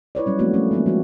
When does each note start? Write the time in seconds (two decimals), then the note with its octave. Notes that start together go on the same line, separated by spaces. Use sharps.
0.15 E4 B4 C#5 D5
0.26 F#3 G3 C#4
0.39 F3 A3 A#3 C4 E4 F#4
0.54 A3 C#4
0.71 E3 G#3 A#3 B3 D4
0.86 F3 F#3 G#3 F#4